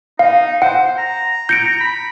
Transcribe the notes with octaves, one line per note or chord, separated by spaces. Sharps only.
D#4 F5
C5 F#5
A#5
G6 C#7 D7
B5